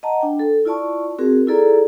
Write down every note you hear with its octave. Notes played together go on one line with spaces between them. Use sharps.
D#5 F#5 A5 A#5
D4 G5
A4
E4 F4 D5 A5 C#6
C4 F#4 G#4 A#4
E4 F4 G#4 A4 D5 A#5